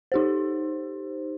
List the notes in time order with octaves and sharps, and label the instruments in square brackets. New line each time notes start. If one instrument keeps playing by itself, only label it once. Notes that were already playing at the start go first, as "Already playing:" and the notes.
[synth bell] D#4 G4 C5